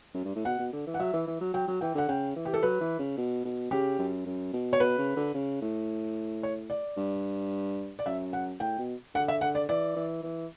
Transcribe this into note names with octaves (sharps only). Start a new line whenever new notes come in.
F#2
G2
A2
B2 F#5
B2
D3
E3
F#5
F#3 E5
E3
E3
F#3
F#3 G5
F#3
E3 G5
D3 F#5
C#3 G5
E3
G4
A4
F#3 B4
E3
C#3
B2
B2
C#3 G4
F#2
F#2
B2
C#5
B2 B4
C#3
D3
C#3
A2
C#5
D5
G2
D5
F#2 E5
F#5
A2 G5
B2
D3 F#5
E5
D3 F#5
D5
E3 D5
E3
E3